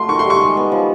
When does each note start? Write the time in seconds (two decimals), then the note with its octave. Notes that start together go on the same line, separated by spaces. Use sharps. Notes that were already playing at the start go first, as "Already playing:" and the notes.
Already playing: F#3 A3 C6
0.08 D#3 C#6
0.19 C6
0.24 G3
0.30 C#6
0.41 G#3
0.57 B3
0.72 F3